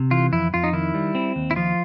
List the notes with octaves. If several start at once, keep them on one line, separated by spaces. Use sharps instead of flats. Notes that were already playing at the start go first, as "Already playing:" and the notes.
Already playing: C3
E3 F4
F2 E4
F2 F4
D#4
D#3 E4
G3
C4
D#2
E4
F3 F4